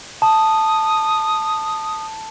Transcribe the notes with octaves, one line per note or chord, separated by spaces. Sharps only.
A5 D#6